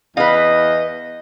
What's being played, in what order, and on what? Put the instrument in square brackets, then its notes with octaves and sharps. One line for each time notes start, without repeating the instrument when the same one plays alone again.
[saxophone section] E2 D#5 [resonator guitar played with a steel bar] B4 F5